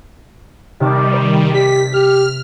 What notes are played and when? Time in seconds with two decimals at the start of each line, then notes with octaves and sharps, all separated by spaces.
0.80 C3 D#3 G3 A5 D6
1.13 C5
1.54 G4 B6
1.94 G4 F6